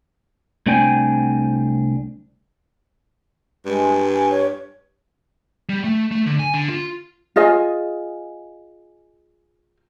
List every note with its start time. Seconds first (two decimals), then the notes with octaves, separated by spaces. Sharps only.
0.66 C2 A3 C4 D4 G5 G#5
3.66 G2 G#3
4.13 G#5
4.30 C#5
5.70 G3
5.84 A3
6.12 A3
6.27 D3
6.39 G#5
6.54 D3
6.70 F4
7.36 F4 G#4 D#5 G#5